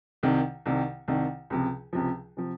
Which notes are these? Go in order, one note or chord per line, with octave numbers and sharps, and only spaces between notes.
C2 C3 D#3
C2 C3 D#3
C2 C3 D#3
C#2 C3 F3
C#2 C3 F3
C3 F3